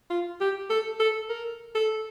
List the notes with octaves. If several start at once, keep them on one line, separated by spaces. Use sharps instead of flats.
F4
G4
A4
A4
A#4
A4